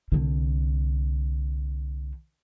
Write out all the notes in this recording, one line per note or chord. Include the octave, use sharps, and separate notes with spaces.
C2 D3